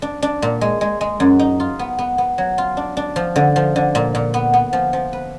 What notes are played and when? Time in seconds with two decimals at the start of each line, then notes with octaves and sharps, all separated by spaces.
0.02 D4
0.22 D4
0.42 A#2
0.61 G#3
0.81 G#3
1.01 G#3
1.20 F#2
1.39 D#4
1.60 F4
1.79 B3
1.99 B3
2.18 B3
2.38 F#3
2.58 F4
2.77 D4
2.97 D4
3.16 F3
3.36 D3
3.56 F3
3.76 D3
3.95 A#2
4.15 A#2
4.34 B3
4.54 B3
4.73 F3
4.93 F3
5.13 B4